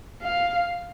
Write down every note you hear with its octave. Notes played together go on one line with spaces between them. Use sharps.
F5